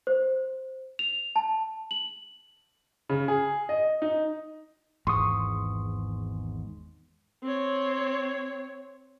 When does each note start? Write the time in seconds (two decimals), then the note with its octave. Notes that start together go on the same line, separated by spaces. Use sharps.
0.07 C5
0.99 F7
1.36 A5
1.91 F#7
3.09 C#3
3.28 G#4
3.69 D#5
4.02 D#4
5.07 G#1 E2 G#2 C6 C#6 D#6
7.43 C4 C#5